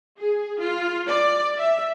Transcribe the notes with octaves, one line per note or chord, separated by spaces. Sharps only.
G#4
F4
D5
E5